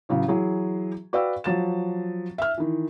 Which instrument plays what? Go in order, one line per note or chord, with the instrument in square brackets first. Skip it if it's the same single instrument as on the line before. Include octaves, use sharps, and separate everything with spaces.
[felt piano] A1 C#3 F#3
E3 F#3 G#4
F#4 B4 D5 F5 G5 E6
F3 F#3 A6 E7
E5 F6
D#3 E3